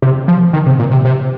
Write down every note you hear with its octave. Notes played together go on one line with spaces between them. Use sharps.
C3
F3
D#3
C3
A#2
C3
C3